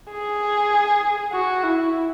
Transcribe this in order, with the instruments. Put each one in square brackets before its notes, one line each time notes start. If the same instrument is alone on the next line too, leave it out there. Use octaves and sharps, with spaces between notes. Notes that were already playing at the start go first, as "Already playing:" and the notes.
[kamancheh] G#4
F#4
E4